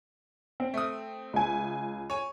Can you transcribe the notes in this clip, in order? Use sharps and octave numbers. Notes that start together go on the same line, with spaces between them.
C4
A3 D#6
C#2 G#5
C#5 G#5